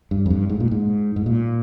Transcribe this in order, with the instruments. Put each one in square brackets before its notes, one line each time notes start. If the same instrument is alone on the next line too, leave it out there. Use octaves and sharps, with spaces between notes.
[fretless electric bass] G2
F2
G2
G#2
A#2
G#2
G#2
A#2